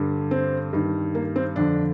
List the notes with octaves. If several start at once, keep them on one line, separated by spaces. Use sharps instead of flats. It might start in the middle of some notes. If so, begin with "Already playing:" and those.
Already playing: G2 D3
C4
G2 D#3
A#3
C4
F2 D3 D4